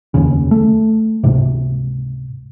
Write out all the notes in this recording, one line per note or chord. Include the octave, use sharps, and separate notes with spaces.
F1 D#2 C#3
A3
C#2 G#2 C3